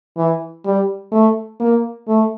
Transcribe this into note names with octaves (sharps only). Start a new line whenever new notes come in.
E3
G3
A3
A#3
A3